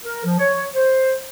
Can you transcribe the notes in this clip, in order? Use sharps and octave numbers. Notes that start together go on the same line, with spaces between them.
A#4
F3
C#5
C5